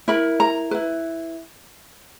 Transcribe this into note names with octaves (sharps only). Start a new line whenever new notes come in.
E4 A#4 B5
A#5
E4 B4